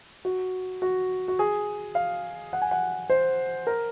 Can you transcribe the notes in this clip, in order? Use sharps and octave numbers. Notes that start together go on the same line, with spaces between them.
F#4
F#4
F#4
G#4
F5
F#5
G#5
F#5
C5
A#4